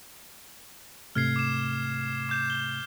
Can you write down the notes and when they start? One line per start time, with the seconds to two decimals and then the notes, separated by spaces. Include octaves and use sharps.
1.15 G#2 C3 A3 F6 G#6 C7
1.36 D6 E7
2.29 D6 G6 E7
2.50 G7